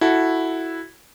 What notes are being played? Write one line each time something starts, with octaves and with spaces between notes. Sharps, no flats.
E4 F#4 A4